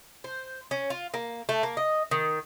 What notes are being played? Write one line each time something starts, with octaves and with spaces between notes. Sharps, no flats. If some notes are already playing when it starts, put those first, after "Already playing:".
C5
C#4
F4
A#3
A3
A#3
D#5
D#3